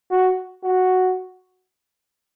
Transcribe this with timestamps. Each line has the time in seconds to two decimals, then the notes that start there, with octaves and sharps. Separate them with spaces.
0.11 F#4
0.63 F#4